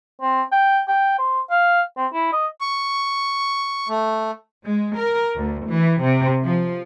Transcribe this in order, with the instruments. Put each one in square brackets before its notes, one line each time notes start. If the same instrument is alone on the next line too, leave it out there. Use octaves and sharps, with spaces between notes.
[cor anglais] C4
G5
G5
C5
F5
C4
E4
D#5
[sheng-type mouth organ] C#6
A3
[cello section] G#3
A#4
D2
E3
C3
F3